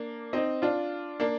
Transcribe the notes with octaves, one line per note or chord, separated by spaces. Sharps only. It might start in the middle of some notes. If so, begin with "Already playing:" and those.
Already playing: A#3 D4
C4 D#4
D4 F4
A#3 D4